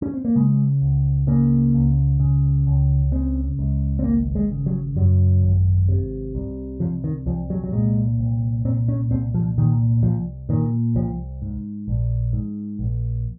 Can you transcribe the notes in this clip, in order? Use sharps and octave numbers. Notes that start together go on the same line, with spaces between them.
C#4
C4
A#3
C#3 G#3
C#2
C#3 A#3
C#2
C#3
C#2
C#3 C4
C#2
C4
G#1 A#3
G#3
C#3
F#3
F#2 F#3
G#1
C3
C2
C3 F3
D#3
C2 F3
F#3
F#3
A#2 G#3
C2
A#2 C4
C#4
C2 C4
F3
A#2 D#3
C2 F3
A#2 D#3
C2 F3
G#2
A#1
G#2
A#1